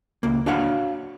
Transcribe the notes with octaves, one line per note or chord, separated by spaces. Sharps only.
C#2 A#3
D4 F#4 C#5 F5 F#5